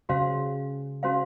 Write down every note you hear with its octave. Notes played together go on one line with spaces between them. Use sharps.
C#3 C#4 F#4 C5 F5
C#4 F#4 C5 F5